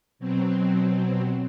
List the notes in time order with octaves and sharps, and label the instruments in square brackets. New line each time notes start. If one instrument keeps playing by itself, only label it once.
[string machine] B2 F#3 C4